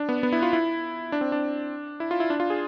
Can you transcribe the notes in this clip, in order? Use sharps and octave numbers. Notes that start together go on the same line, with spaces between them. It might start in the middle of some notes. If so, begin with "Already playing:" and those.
Already playing: D4
B3
B3
E4
F4
E4
D4
C4
D4
E4
F4
E4
D4
F4
G#4